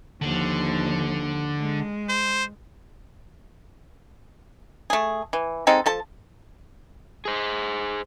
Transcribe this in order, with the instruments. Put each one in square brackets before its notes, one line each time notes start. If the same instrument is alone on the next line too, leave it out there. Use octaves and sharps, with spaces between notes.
[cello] D#2 F3 [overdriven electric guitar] D3
[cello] G#3
[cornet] C5
[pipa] A3 G#4
E3
G#3 C4 D#4 A4
F3 A4 A5
[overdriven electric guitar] G#4 C5